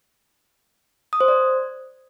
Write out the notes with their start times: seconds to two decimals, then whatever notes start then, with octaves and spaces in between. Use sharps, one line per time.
1.13 D#6
1.21 C5
1.28 D5